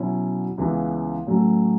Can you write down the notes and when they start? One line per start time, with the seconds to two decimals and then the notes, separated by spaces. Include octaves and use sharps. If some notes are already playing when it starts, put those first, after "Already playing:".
Already playing: B2 F#3 C#4 E4
0.58 C#2 C#3 E3 B3
1.27 A2 F#3 A3 C#4